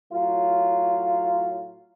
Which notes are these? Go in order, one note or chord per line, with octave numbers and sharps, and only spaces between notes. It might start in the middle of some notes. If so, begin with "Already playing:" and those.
A2 F#3 F4